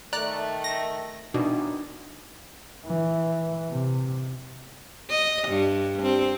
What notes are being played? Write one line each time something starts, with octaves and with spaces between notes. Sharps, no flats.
D#3 A3 D5 A#5 F#6 F#7
A#6
F#2 B2 D#3 E3 D4 D#4
E3
C3
D#5
G2
C4